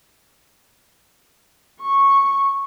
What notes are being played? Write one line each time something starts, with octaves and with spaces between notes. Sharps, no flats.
C#6